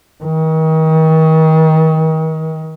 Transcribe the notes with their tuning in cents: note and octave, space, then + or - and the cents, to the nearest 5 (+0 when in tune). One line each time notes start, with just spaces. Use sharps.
D#3 +35